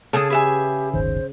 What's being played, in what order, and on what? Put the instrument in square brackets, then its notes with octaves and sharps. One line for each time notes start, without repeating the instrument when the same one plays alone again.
[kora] C#3 G#4 [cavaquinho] A4 A5 D#6
[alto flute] G4 [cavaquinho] B4 E5 G#5
[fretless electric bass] D1 G1 D#3 [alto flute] C5